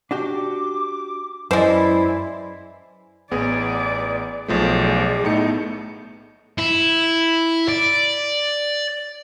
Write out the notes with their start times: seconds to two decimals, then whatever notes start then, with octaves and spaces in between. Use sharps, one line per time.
0.11 D4 F#4 G4 D6
1.51 F#2 E3 G#3 E4 C5 D5
3.31 A1 B3 G#4 D5
4.48 B1 F3 A3 G#4 D5
5.23 A2 A3 B3 D#4 C#7
6.58 E4
7.69 D5